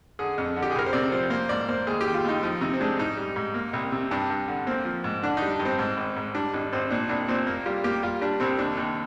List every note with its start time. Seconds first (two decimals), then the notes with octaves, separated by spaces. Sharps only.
0.19 D3 G#4
0.38 F2
0.56 D3
0.62 G4
0.71 G#4
0.75 C2 A#4
0.86 C5
0.93 C3 D5
1.12 F3 C5
1.30 A#3 C5
1.49 G#2 D5
1.69 A#3 C5
1.87 D#2 G#4
2.01 D#3 G4
2.14 F4
2.24 D#2 D#4
2.43 F3 D#4
2.61 C3 D#4
2.74 C4
2.81 G#3 D4
2.99 G#2 D#4
3.17 G3
3.36 G#2
3.54 A#3
3.73 C2
3.92 C3
4.11 G2 D4
4.30 G2
4.48 D3
4.67 A#3 C4
4.85 F3
5.04 G#2
5.22 D3 D4
5.37 D#4
5.42 G3
5.51 D4
5.60 G2
5.65 C4
5.79 G#2
5.97 G#1
6.16 G#2
6.34 G3 D4
6.54 G#1 D4
6.73 G#1 C4
6.90 A#2 D4
7.09 C2 D4
7.28 A#2 C4
7.47 A#3
7.66 G3 F4
7.84 A#3 G4
8.03 G3 F4
8.21 G3 D4
8.40 C2 C4
8.59 D#2 D4
8.77 D#2 D4